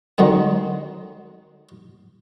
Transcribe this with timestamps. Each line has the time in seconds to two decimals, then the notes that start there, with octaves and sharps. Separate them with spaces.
0.18 D3 D#3 F#3 G#3 C4